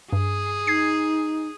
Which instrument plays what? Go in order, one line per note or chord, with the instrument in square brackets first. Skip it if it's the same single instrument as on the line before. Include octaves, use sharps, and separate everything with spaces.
[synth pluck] G2 [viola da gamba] G#4
[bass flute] D#4 [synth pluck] G#6 C7